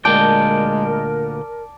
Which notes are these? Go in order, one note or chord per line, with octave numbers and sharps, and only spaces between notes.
D2 A#2 G#3 A#4 D5 G5 A5